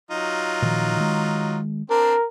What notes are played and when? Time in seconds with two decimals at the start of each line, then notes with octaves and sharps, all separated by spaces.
0.11 F#3 D#4 F4
0.62 A#2 D#3 F3
0.96 D#3 G#3
1.90 C4 D4 A#4